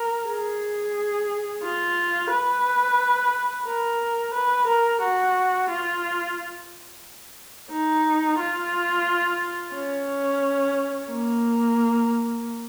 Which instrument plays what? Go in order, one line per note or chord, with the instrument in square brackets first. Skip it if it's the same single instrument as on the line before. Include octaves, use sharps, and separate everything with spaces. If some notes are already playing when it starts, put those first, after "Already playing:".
Already playing: [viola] A#4
G#4
F4
B4
A#4
B4
A#4
F#4
F4
D#4
F4
C#4
A#3